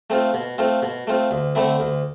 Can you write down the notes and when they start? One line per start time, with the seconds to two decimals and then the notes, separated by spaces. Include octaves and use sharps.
0.10 A3 C4 F4
0.34 B2
0.58 A3 C4 F4
0.82 B2
1.07 A3 C4 F4
1.31 D2
1.55 D3 A3 C4 E4
1.80 D2